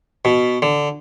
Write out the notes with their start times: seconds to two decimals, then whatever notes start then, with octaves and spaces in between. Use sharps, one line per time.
0.25 B2
0.62 D3